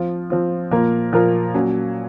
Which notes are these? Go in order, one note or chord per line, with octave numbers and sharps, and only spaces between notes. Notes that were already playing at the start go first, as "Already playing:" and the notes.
Already playing: F3 C4 F4
F3 C4 F4
A#2 F3 A#3 F4 A#4
A#2 F3 A#3 F4 A#4
A#2 F#3 C#4